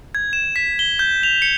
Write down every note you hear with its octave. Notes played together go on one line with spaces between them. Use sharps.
G#6
E7
B6
G7
G6
F7
C#7